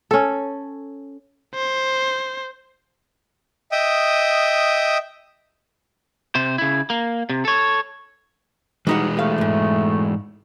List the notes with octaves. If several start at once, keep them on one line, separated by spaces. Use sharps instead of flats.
C#4 A4
C5
D#5 E5 G5 D#6
C3 C5
C#3 E4
A#3
C3
A4 C#5
E3 G3 G#3 D#4 F#4
A3 G4 F5
F2 G#2